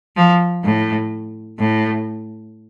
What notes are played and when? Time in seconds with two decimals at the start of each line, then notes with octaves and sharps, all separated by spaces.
0.16 F3
0.64 A2
1.59 A2